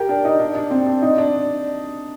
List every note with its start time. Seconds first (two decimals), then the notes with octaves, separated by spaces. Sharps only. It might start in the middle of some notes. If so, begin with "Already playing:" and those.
Already playing: G4 A#4
0.09 D4
0.25 D#4
0.40 D4
0.55 D4
0.71 C4
0.87 D4
1.02 D#4
1.18 D4